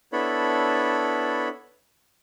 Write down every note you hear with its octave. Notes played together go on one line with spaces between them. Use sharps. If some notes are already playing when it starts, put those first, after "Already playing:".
B3 D4 E4 A4 C#5 B5